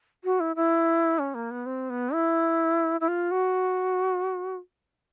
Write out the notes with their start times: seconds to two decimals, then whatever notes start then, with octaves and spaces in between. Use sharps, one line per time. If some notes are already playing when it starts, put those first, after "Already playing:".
0.24 F#4
0.40 E4
0.56 E4
1.19 C#4
1.35 A#3
1.51 B3
1.66 C4
1.90 B3
2.13 E4
3.01 E4
3.08 F4
3.31 F#4